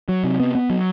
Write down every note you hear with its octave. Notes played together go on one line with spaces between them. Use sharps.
F#3
C3
B3
B3
F#3